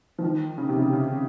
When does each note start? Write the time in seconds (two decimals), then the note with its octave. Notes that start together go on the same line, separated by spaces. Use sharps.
0.19 F3
0.22 D#3
0.58 C#3
0.69 C3
0.79 C#3
0.93 C#3